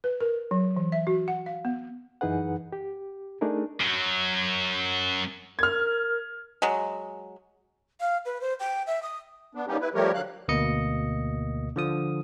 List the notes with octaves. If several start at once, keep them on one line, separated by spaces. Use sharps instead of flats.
B4
A#4
F#3
E3
E5
F#4
F#5
F5
B3
F#2 E3 D#4 G#4 B4 F#5
G4
A3 D4 D#4 G#4 A#4
F#2 F#3
A#4 F6 G#6
F#3 G#3
F5
B4
C5
G5
E5
D#6
B3 D4
G3 A#3 B3 C#4 D#4 G4
E4 B4
F3 G3 A3 G4 A#4 C#5
D3 F#3 F5 F#6
D2 B2 A#3 D#5 C#7
D3 F3 D#6